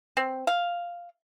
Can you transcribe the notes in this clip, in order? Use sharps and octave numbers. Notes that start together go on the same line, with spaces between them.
C4
F5